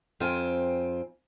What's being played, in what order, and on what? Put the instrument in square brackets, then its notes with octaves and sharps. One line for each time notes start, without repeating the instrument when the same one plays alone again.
[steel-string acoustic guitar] F2 C4 F4 C5 G5 G#5